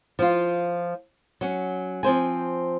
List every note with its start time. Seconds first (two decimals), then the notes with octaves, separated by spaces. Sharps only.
0.19 F3 F4
1.41 F#3 C#4
2.03 F3 C4 C5 G#5